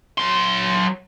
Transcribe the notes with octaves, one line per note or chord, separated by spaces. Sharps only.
F#3 C6